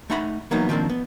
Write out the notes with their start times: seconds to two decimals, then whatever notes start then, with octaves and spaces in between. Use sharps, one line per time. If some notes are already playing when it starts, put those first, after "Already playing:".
0.10 A3 D#4 F#5 A#5 B5
0.51 E3 F#3 A#3 B3 D#4
0.69 D#3 F3 G3 A#3 C4 D4
0.90 B3